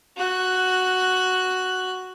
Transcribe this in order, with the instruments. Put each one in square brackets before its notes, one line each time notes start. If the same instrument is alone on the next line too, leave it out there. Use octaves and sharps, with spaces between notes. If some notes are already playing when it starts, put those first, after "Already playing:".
[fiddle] F#4 F#6